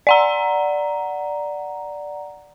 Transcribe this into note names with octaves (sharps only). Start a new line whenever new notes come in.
D5 F#5 A#5